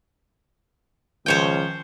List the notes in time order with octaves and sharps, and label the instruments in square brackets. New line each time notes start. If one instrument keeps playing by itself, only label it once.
[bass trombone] C#2 [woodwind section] D#3 F3 [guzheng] C5 C#5 G5